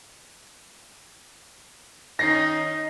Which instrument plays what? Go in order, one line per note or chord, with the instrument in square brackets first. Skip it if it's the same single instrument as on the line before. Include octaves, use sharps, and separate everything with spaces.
[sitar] D#3 C#4 [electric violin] D#4 [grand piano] A#6 C7